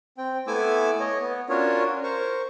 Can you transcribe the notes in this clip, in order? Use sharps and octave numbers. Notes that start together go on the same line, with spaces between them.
C4 G5
A3 B3 E4 G#5 D6 E6
C#5 D#5
B3
C#4 D4 F4 F#4 A#4 C#5
A#4 C5 C#6